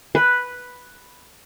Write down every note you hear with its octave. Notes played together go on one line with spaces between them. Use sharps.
B4